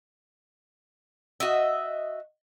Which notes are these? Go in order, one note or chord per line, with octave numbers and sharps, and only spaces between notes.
F#4 D#5 E5